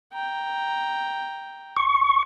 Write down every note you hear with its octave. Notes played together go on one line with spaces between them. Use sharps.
G5 A#5
C#6